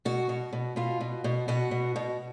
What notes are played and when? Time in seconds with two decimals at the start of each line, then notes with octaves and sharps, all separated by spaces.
0.05 B2 F#4
0.29 B2
0.53 B2
0.76 B2 F4
1.01 B2
1.24 B2
1.48 B2 F#4
1.71 B2
1.96 B2